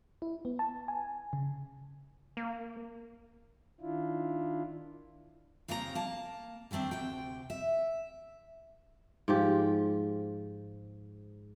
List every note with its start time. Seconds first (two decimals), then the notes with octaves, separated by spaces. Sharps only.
0.22 E4
0.45 B3
0.59 A5
0.88 G#5
1.33 C#3
2.37 A#3
3.81 D#3 D4 E4 F4
5.68 D#2 C#3 A#3 C4 G4 A#5
5.95 A#3 A5
6.71 D3 D#3 A3 C4 D4
6.91 D2 C3 G5
7.50 E5
9.28 G#2 F3 G4